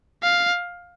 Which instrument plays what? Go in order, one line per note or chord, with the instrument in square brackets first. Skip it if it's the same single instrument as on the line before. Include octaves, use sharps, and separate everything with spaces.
[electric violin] F5